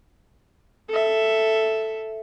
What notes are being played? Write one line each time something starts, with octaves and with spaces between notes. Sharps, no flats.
A4 E5